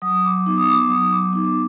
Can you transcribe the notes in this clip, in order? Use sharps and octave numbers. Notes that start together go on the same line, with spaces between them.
F#3 D#6
D6
B3 D#4 D6
D#6
D6
F#3 D#6
D6
B3 D#4 D6
D6